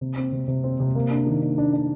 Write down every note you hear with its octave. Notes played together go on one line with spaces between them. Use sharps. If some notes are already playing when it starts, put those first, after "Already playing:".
C3
C4
C3
C3
C4
C3
A#3
D4
D#3
D4
D4
D4